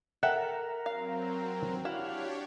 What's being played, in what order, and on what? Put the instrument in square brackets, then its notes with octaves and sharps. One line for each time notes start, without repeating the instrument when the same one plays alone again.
[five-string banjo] A4 E5 G5 [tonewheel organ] A#4 [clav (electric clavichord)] F#5
[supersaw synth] F#3 C4 [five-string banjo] F5
[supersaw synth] D4 G4 C#5 [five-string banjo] E4 [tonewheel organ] F#4 F5